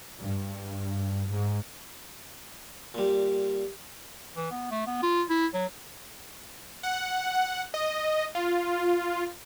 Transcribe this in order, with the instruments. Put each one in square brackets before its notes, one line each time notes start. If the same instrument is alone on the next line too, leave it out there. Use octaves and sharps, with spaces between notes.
[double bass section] G2
G#2
[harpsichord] A#2 G3
[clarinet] E3
B3
A3
B3
F4
E4
F#3
[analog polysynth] F#5
D#5
F4